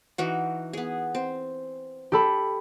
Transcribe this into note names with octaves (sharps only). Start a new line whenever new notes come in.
E3 D#4 F#4
B3 G#4
C4
G4 A4 B5